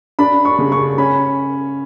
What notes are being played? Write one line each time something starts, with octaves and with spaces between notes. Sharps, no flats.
D4 B5
C#6
C#3
C#6
C#4 B5